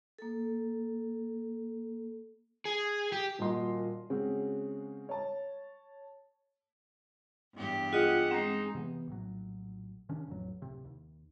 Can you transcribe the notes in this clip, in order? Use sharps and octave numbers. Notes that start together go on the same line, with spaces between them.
A#3 A4
G#4
G4
D#1 A#2 F#4 D#5 C6
C#3 G#3 C4 C#4 F#4
C#5 A5
E2 G2 G4
F4 G#4 D#5 F#5 D#6
G#3 C4 D#4
C3 E3 B3
A#1 A2 F#3
C3 D#3 C#4 D4
A1 F2 F#3
D1 C#2 C3
D#2